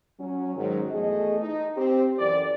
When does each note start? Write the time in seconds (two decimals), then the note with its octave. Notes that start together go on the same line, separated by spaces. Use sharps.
0.20 F#3 C#4
0.56 G#2 D#3 F#3
0.91 E2 A3 G#4 A4 D#5
1.40 D#4
1.76 C4 G4
2.18 F#2 E3 A4 D5